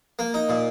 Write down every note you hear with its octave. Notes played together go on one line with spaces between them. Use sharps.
A#3
D#4
A#2